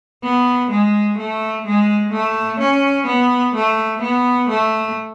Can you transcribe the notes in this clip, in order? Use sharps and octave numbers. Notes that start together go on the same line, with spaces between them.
B3
G#3
A3
G#3
A3
C#4
B3
A3
B3
A3